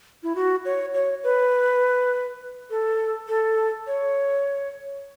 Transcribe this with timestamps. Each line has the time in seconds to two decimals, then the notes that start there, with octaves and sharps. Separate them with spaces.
0.23 E4
0.36 F#4
0.65 C#5
0.94 C#5
1.24 B4
2.70 A4
3.28 A4
3.87 C#5